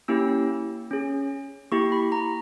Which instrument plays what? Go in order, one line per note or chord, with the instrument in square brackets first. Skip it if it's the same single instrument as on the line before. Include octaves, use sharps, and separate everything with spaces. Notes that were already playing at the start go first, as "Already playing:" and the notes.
[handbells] A#3 C#4 E4 G4 E6
C#4 G#4
A#3 E4 G4 C#6
B5
A#5